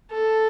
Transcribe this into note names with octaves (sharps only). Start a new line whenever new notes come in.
A4